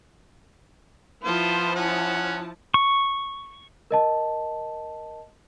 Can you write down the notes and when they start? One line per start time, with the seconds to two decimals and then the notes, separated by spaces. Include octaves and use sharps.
1.25 F3 B3 E4 F4 C5 A5
1.75 C#4 F#5
2.74 C#6
3.91 A#4 D#5 A5